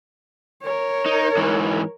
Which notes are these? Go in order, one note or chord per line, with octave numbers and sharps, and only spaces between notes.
A#4 C#5
D#4
G#2 E3